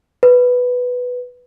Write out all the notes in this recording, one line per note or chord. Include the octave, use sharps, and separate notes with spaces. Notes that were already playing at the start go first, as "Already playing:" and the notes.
B4